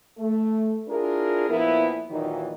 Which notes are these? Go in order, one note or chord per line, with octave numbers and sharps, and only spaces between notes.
A3
D4 E4 F4 G#4 A#4
A#2 F3 B3 E4
D#2 A#2 D#3 E3 F#3 D#4